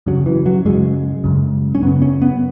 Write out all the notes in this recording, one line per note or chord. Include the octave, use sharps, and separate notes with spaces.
F#2 C#3 F#3
E3
F#3
F#2 C#3 G#3
F#2 C#3
C#4
F#2 C#3 B3
C#4
B3